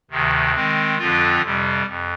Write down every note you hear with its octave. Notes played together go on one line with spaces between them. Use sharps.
D2 C3 D#3
D#3 G#3 C4
F2 D3 F3 C4 F4
F2 C3 G3
F2